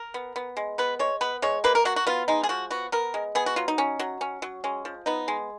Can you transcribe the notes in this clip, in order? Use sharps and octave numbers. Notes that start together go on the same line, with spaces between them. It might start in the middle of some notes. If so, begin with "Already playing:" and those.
Already playing: A#4
B3
B3
G#3
B3 B4
G#3 C#5
B3 B4
G#3 C#5
A#3 B4
A#4
F#3 F#4
F#4
B3 F4
G#3 D#4
G#4
F3 F#4
B3 F#4
B3 A#4
G#3
B3 G#4
F#4
F#3 F4
D#4
C#4
F#3
C#4
F#3
G#3 C#4
F3
B3 D#4
G#3